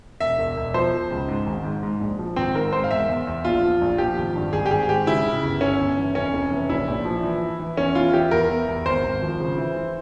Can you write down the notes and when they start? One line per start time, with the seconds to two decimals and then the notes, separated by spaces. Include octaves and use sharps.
0.20 E1 E5
0.38 E1
0.56 E1
0.74 F3 C5
0.92 F3
1.11 C#2
1.29 G#2
1.47 G#1
1.64 G#2
1.83 G#2
2.01 A#1
2.19 F3
2.36 G#1 C4
2.55 G#2 A#4
2.73 G#2 C5
2.84 F5
2.91 E2 E5
3.08 E2
3.27 E2
3.45 A#1 F4
3.63 F3
3.81 A#1
3.98 F3 G4
4.17 G#1
4.36 G2
4.53 G#1 G#4
4.66 G4
4.71 G#1 G#4
4.89 G#2 G4
5.07 C#3 E4
5.25 C#3
5.43 G1
5.61 G1 C#4
5.79 G1
5.97 E3
6.15 F1 C#4
6.33 F1
6.52 E3
6.69 A#1 E4
6.88 A#1
7.05 F3
7.23 E3
7.42 E3
7.60 E3
7.77 E2 C#4
7.95 E3 F4
8.13 E3 G4
8.31 E2 A#4
8.50 E3
8.68 E2
8.86 G#1 C5
9.03 G#1
9.22 F3
9.40 C#3
9.58 E3
9.76 E3